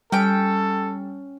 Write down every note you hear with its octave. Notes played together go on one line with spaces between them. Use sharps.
G3 C#4 A4 G5